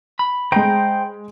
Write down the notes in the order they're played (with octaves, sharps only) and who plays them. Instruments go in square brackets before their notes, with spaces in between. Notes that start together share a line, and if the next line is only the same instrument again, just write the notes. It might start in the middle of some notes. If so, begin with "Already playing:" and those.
[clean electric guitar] B5
[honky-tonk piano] G#3 D7 [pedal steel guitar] C5 G5 A#5